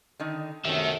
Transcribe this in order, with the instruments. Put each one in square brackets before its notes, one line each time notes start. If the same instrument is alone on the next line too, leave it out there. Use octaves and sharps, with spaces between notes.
[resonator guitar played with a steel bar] D3 D#3 D#4
[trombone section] B1 F#2 C3 [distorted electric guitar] D#3 [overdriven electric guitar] A4 E5 [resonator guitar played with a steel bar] G5